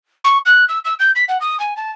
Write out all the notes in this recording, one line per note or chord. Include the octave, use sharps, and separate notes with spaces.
C#6
F#6
E6
E6
G6
B6
F#5
D#6
G#5
A5